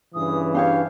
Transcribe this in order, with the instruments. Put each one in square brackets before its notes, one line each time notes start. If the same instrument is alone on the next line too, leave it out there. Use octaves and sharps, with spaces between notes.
[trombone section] G2 C#3 E3 [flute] D#6
[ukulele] D4 G4 C#5 [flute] F5